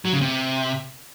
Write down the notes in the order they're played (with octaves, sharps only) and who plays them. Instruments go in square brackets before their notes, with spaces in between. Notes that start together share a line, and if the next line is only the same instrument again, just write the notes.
[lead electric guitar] F#3
C#3
C3